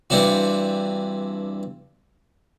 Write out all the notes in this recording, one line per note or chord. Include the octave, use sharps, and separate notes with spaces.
G2 E3 C4 D4 F#4